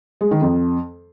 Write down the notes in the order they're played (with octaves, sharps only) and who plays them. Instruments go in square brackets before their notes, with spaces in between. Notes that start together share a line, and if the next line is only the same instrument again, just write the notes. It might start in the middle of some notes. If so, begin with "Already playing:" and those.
[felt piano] G#3
D#3
F2